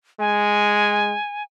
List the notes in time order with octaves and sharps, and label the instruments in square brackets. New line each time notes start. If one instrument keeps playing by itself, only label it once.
[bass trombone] G#3 [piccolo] G#5